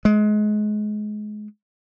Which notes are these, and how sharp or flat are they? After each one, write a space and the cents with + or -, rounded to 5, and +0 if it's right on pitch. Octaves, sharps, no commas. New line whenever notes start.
G#3 +25